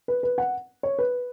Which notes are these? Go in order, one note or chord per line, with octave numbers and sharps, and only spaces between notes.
B4
B4
F#5
C#5
B4